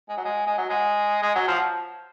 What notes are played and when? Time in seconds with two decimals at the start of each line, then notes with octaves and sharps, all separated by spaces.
0.09 G#3
0.17 F#3
0.25 G#3
0.47 G#3
0.58 F#3
0.69 G#3
1.22 G#3
1.35 F#3
1.48 F3